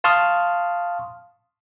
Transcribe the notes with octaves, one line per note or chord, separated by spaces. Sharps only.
F5 A5 C6 C#6 D#6 F6